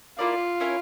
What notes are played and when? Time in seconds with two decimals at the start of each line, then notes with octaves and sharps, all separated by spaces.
0.19 A#3 E4 F4 A#4 D5
0.60 C#4 E4 A#4 C#5